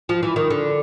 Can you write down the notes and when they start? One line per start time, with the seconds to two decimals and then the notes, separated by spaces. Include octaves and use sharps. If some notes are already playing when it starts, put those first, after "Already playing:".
0.09 F3
0.23 E3
0.36 D#3
0.50 D3